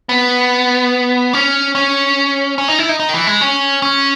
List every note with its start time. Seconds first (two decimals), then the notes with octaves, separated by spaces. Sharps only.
0.09 B3
1.33 C#4
1.75 C#4
2.58 C#4
2.68 D#4
2.79 E4
2.89 D#4
3.00 D#4
3.09 D#3
3.14 E3
3.27 G#3
3.41 C#4
3.82 C#4